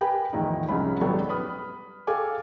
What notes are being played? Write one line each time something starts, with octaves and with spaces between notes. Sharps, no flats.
G4 A#4 B4 G5 G#5 B5
E2 A2 D#3 F3 D#4
C2 F3 G#3 C#4 B5
G#1 F#3 G3 B3 A4
B4 B5 D#6 F6
G#4 A4 F5 G5 G#5 D6